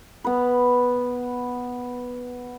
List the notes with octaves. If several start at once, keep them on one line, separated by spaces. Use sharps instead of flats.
B3 B4